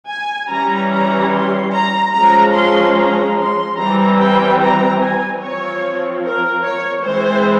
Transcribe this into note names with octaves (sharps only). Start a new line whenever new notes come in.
G#5
E3 G3 C#4 A#5
A#5
C6
A#5
F3 G#3 C#4 A#5
C6
A#5
C6
E3 G3 C4 A#5
G5
A#5
G#5
F3 C4 C#5
A#4
C#5
E3 G#3 C4 C5